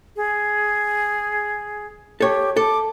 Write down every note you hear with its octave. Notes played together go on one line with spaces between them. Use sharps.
G#4
G4 A4 C#5
A4 D6